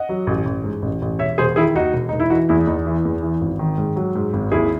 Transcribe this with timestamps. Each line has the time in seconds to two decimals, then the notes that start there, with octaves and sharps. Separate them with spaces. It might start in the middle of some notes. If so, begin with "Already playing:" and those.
Already playing: D#5 F#5
0.09 F#3
0.27 A1
0.45 A1
0.64 G#2
0.82 A1
1.02 A1
1.19 E1 C#5 E5
1.38 E1 G#4 C5
1.56 D#3 E4 G#4
1.75 D#2 D#4 F#4
1.93 E1
2.09 E1 D#4
2.20 E4
2.30 E3 D#4 F#4
2.49 E2 E4
2.67 E2 D#4
2.86 E3
3.05 E2
3.23 E3
3.41 G#1
3.59 D#3
3.78 G#2
3.96 F#3
4.15 G#2
4.33 G#1
4.52 D#2 E4 G#4